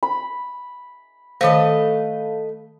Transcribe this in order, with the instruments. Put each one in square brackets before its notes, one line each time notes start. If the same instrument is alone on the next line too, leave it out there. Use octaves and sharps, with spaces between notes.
[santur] B5
[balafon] D#3 C5 [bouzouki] A3 B4 D#5 [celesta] F5